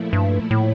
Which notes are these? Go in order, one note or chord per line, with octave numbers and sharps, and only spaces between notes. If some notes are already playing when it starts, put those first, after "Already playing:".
Already playing: A#2 F3 A3 E4
G2
A2